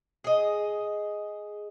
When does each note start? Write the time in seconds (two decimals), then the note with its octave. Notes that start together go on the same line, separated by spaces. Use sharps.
0.24 G#4 D#5